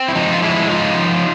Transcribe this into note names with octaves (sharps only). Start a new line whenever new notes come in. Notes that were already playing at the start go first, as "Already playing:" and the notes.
Already playing: C4
E4
F3 D#4
F4
G#3 D4 E4
F3 D#4 F4